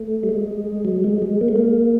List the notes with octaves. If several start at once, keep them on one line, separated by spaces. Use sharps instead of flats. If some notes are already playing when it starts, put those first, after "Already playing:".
Already playing: A3
G3
G#3
F#3
G#3
G#3
A#3
A3
A#3